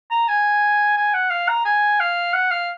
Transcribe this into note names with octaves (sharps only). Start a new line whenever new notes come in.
A#5
G#5
G#5
F#5
F5
A#5
G#5
F5
F#5
F5